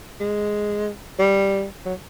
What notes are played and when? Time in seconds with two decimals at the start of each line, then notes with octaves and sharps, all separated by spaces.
0.20 G#3
1.19 G3
1.86 F#3